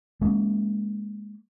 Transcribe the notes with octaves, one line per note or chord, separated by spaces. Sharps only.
G#3 A#3 C#4